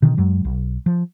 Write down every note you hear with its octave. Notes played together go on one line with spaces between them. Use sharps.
B2 D3 D#3
F#2 F#3 G#3
B1
F3